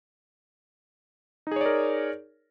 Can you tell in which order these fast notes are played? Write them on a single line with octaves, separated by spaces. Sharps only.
D#4 G#4 C#5 D5 A#4